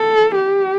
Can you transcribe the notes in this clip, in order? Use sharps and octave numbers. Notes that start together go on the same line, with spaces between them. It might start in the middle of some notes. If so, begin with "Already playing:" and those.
Already playing: A4
G4